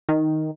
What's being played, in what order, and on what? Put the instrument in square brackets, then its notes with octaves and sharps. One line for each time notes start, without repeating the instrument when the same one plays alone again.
[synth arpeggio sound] D#3